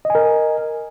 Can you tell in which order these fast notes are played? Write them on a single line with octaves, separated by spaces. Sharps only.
D#5 G#5 A#4